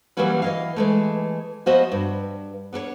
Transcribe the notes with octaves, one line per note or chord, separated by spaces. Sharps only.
E3 F#3 G3 A#3 C#4 B4
E3 D#5 F5
E3 G#3 A3
F3 B3 F#4 C5 D#5 E5
G2
B3 D4 B4 C#5